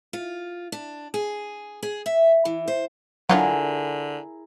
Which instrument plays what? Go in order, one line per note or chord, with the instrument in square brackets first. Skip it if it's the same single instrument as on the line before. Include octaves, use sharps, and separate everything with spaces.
[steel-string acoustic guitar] F4
D4
G#4
G#4
E5
E3
C5
[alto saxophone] D3 [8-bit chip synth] F#3 [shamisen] D4 F4 F#5 [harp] E4 G#4 A#4